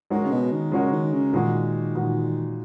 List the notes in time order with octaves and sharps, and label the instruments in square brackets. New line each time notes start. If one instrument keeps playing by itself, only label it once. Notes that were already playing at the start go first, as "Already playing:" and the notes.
[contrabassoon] G#2 [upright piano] G#3 C#4 F#4 A#4 C#5
[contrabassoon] C#3
B2
D#3
[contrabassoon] C#3 [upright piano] G#3 C#4 F#4 A#4 C#5
[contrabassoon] D#3
C#3
[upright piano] A#2 G#3 D#4 F#4 [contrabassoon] D#3
[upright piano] A#2 G#3 D#4 F#4